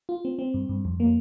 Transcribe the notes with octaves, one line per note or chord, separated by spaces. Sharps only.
F4
C4
C4
G2
G2
F2
A#3